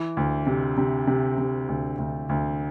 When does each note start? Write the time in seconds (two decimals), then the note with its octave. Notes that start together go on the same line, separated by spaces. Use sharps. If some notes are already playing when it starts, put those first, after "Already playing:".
Already playing: E3
0.17 D2
0.47 C3
0.77 C3
1.07 C3
1.38 C3
1.69 D2
1.98 D2
2.29 D2